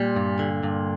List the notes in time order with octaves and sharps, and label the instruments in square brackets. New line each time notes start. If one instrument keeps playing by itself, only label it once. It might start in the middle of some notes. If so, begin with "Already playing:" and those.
Already playing: [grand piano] A#2 [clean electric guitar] G3
[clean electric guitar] G2
D3
G2